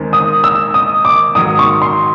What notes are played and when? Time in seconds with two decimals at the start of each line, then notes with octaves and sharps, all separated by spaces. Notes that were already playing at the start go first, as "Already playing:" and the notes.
Already playing: D#2 D#3 G#3 C4 D#4
0.13 D#6
0.44 E6
0.74 D#6
1.05 D6
1.35 G#2 D#3 F#3 D#6
1.59 C#6
1.82 C6